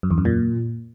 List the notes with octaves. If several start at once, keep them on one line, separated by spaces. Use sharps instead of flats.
F#2
E2
F#2
A#2